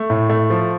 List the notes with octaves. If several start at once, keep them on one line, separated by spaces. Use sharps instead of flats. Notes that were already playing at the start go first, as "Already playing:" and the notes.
Already playing: A3
A2
A3
F3